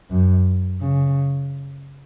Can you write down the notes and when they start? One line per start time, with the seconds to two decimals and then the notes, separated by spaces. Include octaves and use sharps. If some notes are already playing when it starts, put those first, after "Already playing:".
0.11 F#2
0.81 C#3